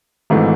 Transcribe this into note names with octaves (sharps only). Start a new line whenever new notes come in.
G#1 G#2 E3 A3